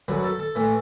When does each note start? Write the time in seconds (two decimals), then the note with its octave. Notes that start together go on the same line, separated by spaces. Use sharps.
0.08 F#2 D3 F#3 B4
0.24 A4
0.39 A4
0.55 A2 E3